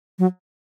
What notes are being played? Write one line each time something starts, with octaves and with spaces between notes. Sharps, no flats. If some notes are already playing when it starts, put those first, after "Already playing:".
F#3